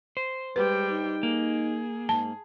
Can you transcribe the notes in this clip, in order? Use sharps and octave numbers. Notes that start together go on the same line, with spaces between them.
C5
G3 G#3 B4 G5
D#4
A#3 G#4
G#2 A5